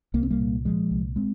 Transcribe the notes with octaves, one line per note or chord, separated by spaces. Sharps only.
C2 A#3
C4
G3 A#3
A#2
A#2 F3 G#3
C2
G#3 C4